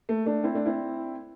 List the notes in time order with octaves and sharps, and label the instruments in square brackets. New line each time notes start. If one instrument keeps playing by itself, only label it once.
[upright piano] A3
A3 D4
C4 E4
A3 D4
C4 E4